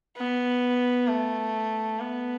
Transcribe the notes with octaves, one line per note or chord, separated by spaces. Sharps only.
B3
A3
B3